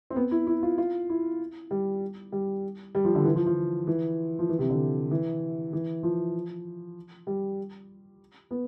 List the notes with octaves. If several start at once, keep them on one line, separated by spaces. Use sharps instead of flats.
C4
B3
E4
E4
F4
F4
E4
G3
G3
G3
F3
D3
E3
F3
F3
E3
F3
E3
C3
D3
E3
E3
F3
G3
B3